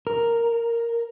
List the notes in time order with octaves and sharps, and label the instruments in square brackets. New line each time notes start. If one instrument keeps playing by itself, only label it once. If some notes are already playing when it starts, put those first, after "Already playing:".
[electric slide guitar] A#4